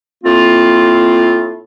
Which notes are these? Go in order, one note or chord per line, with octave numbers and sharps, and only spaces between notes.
A2 A#3 C4 F4